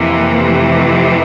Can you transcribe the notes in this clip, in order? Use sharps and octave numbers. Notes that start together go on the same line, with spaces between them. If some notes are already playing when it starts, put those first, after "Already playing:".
Already playing: F2 C3 E3 A#3
A3